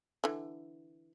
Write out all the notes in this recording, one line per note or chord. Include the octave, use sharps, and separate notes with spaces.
D3 E3